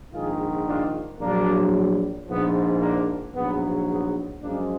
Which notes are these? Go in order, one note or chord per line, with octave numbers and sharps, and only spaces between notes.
A#1 G#2 D#3 G#3 F4 G#4
D4 F4
A#1 A#2 F#3 A#3 D4
A#1 G#2 F3 B3
A#3 D4
A#1 G#2 F#3 B3
B3
F#2 F3 G#3 A#3 D4